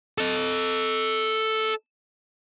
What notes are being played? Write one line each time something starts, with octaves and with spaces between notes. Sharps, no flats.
A4 D#5